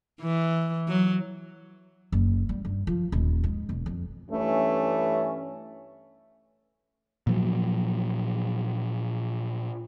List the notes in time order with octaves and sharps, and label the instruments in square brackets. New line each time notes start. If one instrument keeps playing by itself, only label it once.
[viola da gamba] E3
F#3
[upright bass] F#1
G3
G2
F3
D#1
G#2
E1
F2
[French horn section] G2 E3 A3 C#4
[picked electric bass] A#2 F3 F#3